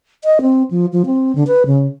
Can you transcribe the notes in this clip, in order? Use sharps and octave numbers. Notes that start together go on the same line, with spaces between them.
D#5
C4
F3
F3
C4
D3
B4
C#3